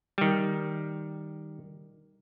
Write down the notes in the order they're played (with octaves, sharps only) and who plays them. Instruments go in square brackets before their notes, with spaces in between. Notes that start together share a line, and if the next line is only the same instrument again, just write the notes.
[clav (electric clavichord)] D#3 G3